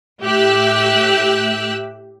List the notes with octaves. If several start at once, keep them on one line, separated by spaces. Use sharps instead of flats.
A2 G4 E5 E6 F#6